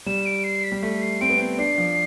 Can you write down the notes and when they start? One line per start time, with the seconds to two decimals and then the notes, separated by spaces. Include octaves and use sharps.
0.06 G3 E7
0.26 D7
0.44 C7
0.64 B6
0.72 G3
0.83 A3 B6
1.01 C7
1.21 C4 D7
1.29 B3
1.38 C4
1.59 D4 C7
1.78 F3